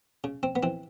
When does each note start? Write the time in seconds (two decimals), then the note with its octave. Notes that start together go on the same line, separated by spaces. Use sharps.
0.24 C#3
0.43 C4
0.56 B3
0.63 E3 C4